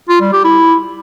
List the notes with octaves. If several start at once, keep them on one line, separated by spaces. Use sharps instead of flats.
F4
G3
G4
E4